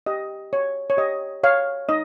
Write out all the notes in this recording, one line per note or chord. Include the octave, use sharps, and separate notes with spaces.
G4 D#5
C#5
C#5
G4 D#5
C#5 F5
D#4 D#5